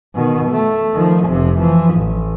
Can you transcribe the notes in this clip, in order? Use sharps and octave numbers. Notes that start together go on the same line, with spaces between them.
B2 D#3
A3
D#3 F3
F1 C3
E3 F3
A1